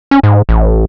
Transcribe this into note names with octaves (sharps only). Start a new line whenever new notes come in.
C#4
G#2
A1